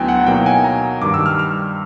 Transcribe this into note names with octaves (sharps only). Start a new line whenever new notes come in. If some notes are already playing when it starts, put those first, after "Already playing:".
Already playing: D2 D3 F#3 B3 E4 G5 G#5
F#5
B2 F#3 A#3 D#4 G5
G#5
A#5
G2 D#3 G3 D6
E6
F6
F6